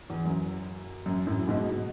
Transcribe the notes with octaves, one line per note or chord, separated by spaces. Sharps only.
E2
F#2
F#2
F#2 A2
G#2 B2
B2